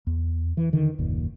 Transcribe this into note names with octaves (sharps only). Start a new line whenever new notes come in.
E2
E3
D3 D#3
F#1 D#2 A#2